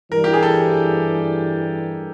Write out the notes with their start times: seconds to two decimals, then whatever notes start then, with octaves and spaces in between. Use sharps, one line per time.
0.11 G2 E3 G3 A#4
0.24 G4
0.33 G#4
0.43 A4